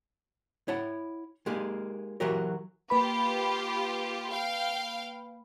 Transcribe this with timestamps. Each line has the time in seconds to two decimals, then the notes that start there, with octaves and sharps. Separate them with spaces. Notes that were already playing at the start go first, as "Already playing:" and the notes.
0.68 E4 C#5 F#5 A5
1.46 G#3 A#3 D#4 G4 G#4
2.20 E3 F#3 F#4 G4 A#4
2.90 A#3 F4 G4 B4 B5
4.31 F5 G5